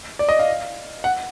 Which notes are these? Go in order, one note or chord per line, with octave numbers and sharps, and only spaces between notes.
D5
D#5
F5
F#5